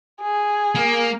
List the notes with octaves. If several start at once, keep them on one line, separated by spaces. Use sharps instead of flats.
G#4
A#3